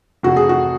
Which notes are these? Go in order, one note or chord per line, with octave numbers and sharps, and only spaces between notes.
F1 F#4
G#4
F#4